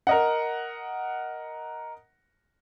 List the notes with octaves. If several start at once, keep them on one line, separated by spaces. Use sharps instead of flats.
A#4 D#5 F#5